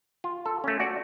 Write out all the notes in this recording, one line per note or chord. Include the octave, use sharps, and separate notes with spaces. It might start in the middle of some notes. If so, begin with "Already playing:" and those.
F4
A4
A3 C#4
F#4 D5